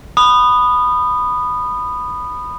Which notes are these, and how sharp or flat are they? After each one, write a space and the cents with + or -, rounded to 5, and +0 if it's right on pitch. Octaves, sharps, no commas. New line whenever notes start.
B5 +5 D#6 -20